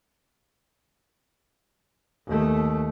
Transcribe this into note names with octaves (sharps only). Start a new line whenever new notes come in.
D#2 A3